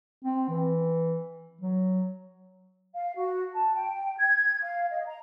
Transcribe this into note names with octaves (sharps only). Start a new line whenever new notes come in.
C4
E3
F#3
F5
F#4
A5
G5
G#6
F5
D#5
A#5